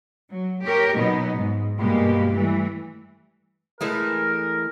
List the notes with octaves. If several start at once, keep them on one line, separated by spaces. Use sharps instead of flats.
F#3
G4 A#4 C#5
B2 F#3 B3 D#4
G#2
G2 B2 G#3 A#3 G4
E3 G3 A3
E3 G#3 A3 A#4